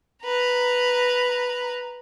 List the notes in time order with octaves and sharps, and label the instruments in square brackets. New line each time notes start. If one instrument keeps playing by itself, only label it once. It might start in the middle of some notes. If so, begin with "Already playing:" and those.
[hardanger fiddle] B4 A#5